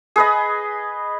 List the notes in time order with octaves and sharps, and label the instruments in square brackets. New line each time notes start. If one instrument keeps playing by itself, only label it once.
[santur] G#4 B4 D#5